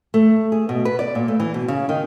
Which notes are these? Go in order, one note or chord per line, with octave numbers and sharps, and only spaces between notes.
A3
G#4
B2
B4
D5
A#2
A3
E3
B2
C#3
D#3